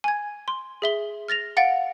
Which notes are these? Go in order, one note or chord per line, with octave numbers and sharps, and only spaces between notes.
G#5 G#6
C6
G#4 E5 G7
F6 A6 A#6 F7
F5 F#5 A6 D7